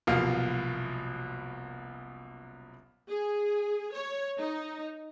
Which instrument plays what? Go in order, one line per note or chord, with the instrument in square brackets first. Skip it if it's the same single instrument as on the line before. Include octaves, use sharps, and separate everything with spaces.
[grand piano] F#1 C2 B2 F3 A#3 F5
[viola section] G#4
C#5
D#4